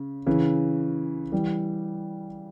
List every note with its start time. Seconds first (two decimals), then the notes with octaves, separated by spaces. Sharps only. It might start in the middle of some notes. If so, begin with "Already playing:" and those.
Already playing: C#3
0.27 C#3 E3
1.32 E3 G3